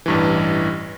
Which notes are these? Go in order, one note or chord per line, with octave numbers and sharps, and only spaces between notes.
A1 G2 E3